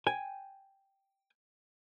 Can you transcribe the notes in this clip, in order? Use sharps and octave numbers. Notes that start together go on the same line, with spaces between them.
G5 G#5